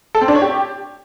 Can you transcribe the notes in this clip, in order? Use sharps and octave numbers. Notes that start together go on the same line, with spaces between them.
A4
C4
D4
C#5
G4